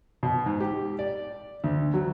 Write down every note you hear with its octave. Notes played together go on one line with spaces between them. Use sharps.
B2
G#2
G4
D5
D2
F#3